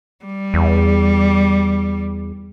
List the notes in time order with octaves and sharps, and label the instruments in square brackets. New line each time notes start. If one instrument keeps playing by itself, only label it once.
[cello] G3
[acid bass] E2